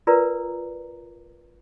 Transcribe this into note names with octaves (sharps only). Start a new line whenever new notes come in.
F4 A#4 B4 D5 A#5